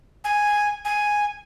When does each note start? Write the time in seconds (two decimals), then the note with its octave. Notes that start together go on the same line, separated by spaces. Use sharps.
0.24 G#5
0.85 G#5